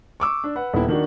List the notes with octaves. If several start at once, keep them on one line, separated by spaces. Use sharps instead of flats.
C#6 D6 E6
D4
B4 F#5
D#1 B3 E4
D#3 D4 F#4